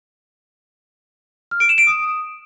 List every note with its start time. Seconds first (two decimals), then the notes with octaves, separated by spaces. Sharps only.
1.51 F6
1.60 D7
1.69 E7
1.78 D7
1.87 D#6